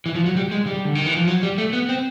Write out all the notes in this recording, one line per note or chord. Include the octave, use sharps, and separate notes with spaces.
E3
F3
F#3
G3
G#3
G3
D3
D#3
E3
F3
F#3
G3
A3
B3
C4